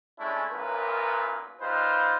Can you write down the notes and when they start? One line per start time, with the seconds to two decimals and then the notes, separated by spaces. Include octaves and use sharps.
0.19 G#3 A3 C#4 D4 E4
0.53 B1 F#2 A#2 A#4 B4
1.61 G3 D#4 F4 B4 C5